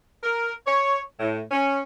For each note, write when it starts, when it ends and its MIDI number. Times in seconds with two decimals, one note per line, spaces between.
0.23 0.52 70
0.66 0.98 73
1.19 1.40 45
1.51 1.80 61